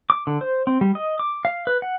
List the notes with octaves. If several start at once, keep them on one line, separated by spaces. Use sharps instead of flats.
D6
D3
C5
C4
G3
D#5
D6
F5
B4
F#5